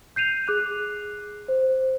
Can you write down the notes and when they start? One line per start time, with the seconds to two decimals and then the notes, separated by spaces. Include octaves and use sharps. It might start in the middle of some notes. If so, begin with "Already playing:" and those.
0.16 G6 C7 D#7 F7
0.47 G#4 D6 F#6 F7
1.48 C5